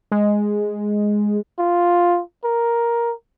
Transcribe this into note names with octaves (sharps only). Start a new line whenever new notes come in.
G#3
F4
A#4